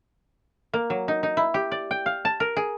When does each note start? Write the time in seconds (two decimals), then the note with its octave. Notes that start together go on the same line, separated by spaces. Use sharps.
0.73 A#3
0.90 F#3
1.08 D#4
1.23 D#4
1.37 E4
1.54 G4
1.72 D5
1.91 G5
2.06 F5
2.25 A5
2.40 A#4
2.57 G#4